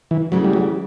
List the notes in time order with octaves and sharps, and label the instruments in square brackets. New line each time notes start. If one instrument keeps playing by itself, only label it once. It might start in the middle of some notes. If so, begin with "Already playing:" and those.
[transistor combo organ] E3
[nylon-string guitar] D2 C#3 E3 [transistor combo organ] F#3
[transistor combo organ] G3
F#3